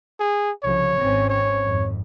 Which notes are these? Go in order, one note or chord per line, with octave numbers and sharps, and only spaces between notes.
G#4
C2 C#3 F3 C#5
G#1 C4 C#4
C#5
G#1 F2